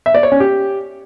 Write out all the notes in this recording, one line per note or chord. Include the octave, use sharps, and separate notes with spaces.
E5
D5
C#5
C#4
G4